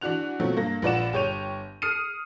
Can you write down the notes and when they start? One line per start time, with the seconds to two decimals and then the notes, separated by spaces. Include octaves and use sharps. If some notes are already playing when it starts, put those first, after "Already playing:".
0.01 E3 D4 F#4 F#6 F7
0.40 B2 F3 F#3 A3 C4
0.57 G2 A#3 A#6
0.82 A#1 F4 B4 D5 F#5 E7
1.13 G1 G4 C#5 G6 D#7 F7
1.82 D#6 F6 C7 C#7 D#7